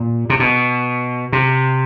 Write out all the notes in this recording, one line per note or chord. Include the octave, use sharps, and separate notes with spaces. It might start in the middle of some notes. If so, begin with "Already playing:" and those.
Already playing: A#2
C3
B2
C3